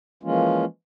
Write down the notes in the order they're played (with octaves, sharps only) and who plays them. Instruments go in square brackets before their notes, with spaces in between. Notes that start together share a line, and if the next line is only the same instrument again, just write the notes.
[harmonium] E3 F3 G#3 A#3 C#4 F4